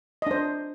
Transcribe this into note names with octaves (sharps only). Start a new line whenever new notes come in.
D4 C5 D#5